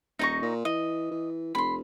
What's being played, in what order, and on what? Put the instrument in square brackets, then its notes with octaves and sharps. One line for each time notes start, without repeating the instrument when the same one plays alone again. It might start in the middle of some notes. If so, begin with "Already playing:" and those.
[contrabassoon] D#1 [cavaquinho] D#4 A#5 C#6
[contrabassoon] A#2
[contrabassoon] E3 [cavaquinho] D#5
[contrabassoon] E3
[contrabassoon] F1 [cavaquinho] B5 C6